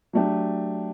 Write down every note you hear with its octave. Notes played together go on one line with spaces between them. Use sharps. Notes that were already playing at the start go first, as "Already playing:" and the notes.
F#3 A3 D4 G4